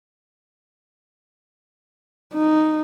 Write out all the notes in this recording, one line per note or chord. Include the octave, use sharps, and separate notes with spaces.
D#4